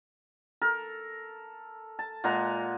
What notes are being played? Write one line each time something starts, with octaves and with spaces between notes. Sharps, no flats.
A4 A#4
A5
A#2 G#3 F#5 A#5